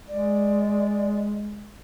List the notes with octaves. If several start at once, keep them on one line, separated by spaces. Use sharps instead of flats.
G#3 D5